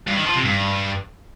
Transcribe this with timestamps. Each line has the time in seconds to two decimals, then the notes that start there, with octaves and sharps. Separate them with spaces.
0.07 G2
0.17 D#3
0.26 F3
0.36 C3
0.45 G2